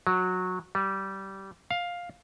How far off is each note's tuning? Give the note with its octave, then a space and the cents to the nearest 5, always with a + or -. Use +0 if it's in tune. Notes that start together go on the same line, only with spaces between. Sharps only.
F#3 -15
G3 -20
F5 +10